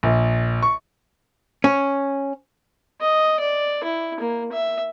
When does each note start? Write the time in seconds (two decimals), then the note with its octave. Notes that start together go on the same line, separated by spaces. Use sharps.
0.03 A#1
0.63 C#6
1.64 C#4
3.01 D#5
3.40 D5
3.84 E4
4.20 A#3
4.52 E5